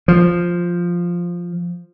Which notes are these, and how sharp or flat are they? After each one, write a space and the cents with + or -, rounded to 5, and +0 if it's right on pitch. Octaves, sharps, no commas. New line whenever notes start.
F3 +0